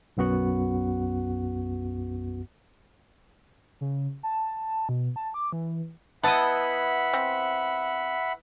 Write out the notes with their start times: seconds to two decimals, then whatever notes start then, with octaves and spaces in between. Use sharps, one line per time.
0.17 B1 F#2 B3 F#4 F#5
3.81 C#3
4.23 A5
4.89 B2
5.16 A5
5.34 D6
5.52 E3
6.23 B3 E4 B4 D#5 E5 F#5 A5 B5
7.14 C4